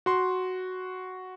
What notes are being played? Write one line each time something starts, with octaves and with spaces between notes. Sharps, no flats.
F#4 C6